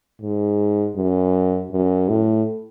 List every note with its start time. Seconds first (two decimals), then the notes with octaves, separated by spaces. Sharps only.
0.21 G#2
0.96 F#2
1.72 F#2
2.09 A2